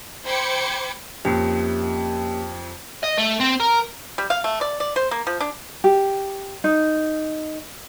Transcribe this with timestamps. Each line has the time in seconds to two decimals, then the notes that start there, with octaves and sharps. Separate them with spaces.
0.25 C5 G5 B5 D6 G#6 C#7
1.25 F2 A#3 C#4 G4
3.03 D#5
3.18 A3
3.40 C4
3.60 A#4
4.18 G3
4.30 F5
4.44 A3
4.61 D5
4.80 D5
4.96 C5
5.11 A#3
5.27 F3
5.41 D4
5.84 G4
6.64 D#4